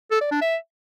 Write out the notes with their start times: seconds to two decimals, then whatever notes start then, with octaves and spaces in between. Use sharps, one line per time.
0.11 A4
0.21 D5
0.31 D4
0.41 E5